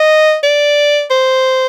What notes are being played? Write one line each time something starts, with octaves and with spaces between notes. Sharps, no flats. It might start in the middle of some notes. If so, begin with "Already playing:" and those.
Already playing: D#5
D5
C5